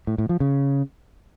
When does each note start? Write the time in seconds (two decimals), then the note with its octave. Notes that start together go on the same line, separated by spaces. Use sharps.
0.07 A2
0.18 A2
0.29 F3
0.40 C#3